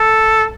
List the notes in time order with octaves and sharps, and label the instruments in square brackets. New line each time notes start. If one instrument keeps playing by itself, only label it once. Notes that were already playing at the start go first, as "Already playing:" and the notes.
Already playing: [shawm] A4